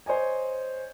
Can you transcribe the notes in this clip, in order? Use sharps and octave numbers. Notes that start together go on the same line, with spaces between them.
C5 C#5 D#5 G#5